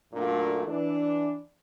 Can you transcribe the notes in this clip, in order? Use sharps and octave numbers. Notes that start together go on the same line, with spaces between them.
F#2 A#2 A3 A#3 D4 F#4
E3 D4